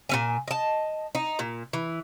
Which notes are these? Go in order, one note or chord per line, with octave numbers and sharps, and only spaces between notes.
A#2 C#4 G#5
D#5 A5
D#4
A#2
E3